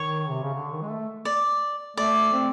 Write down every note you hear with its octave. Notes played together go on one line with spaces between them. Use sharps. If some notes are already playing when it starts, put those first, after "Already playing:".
Already playing: D#3 C#5
C3
C#3
D3
D#3
G#3
A3
D5
A3 D5
C4